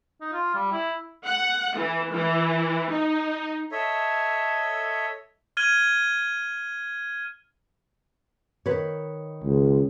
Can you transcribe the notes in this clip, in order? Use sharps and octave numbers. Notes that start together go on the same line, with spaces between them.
D#4
F4
G3
E4
F#5
E3
E3
D#4
A4 C#5 D#5 E5
F6 G#6 D#7 G7
D#3 B4 C#5
C#2